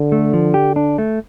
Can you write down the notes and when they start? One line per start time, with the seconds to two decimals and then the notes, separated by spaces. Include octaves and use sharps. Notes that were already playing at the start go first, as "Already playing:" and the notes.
Already playing: D3
0.12 A3
0.33 F3
0.54 G4
0.76 D4
0.98 A3